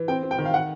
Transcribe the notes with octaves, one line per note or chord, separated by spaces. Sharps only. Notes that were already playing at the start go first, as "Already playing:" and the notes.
Already playing: E3
C4 G5
C4
G5
D#3
F5
F#5